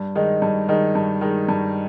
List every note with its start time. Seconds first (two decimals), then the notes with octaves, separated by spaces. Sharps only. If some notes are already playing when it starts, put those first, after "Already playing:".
Already playing: G2
0.15 D#3 G#3 D#4
0.42 G2
0.68 D#3 G#3 D#4
0.95 G2
1.21 D#3 G#3 D#4
1.49 G2